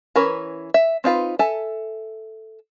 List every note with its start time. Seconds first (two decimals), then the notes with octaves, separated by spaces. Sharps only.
0.16 E3 C#4 A#4 B4
0.74 E5
1.04 C4 D#4 F4 B4
1.39 A4 E5 G#5